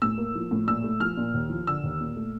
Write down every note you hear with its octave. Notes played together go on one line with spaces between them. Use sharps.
A2 E6
A#3
F3
A2
A#2 E6
A3
F3 F6
A#2
D#2
F3
D3 E6
D#2
A#2
A3